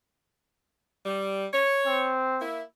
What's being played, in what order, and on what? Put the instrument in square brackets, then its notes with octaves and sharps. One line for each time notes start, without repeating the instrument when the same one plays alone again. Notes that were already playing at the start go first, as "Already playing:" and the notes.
[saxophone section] G3
C#5
[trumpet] C4
[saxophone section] A#3 E4